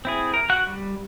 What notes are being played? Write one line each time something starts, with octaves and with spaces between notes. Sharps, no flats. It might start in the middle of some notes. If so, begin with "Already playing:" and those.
C4 E4 G#4
A#4
F#4 F#5 F#6
G3